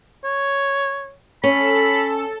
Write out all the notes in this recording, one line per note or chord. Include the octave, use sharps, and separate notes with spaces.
C#5
C#4 A4 B5